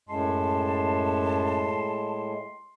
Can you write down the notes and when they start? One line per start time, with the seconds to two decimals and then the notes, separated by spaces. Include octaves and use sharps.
0.09 F#2 A2 G#3 A5 C6